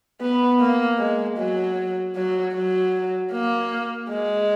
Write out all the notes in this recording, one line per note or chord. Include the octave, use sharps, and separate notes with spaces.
B3
A#3
G#3
F#3
F#3
F#3
A#3
G#3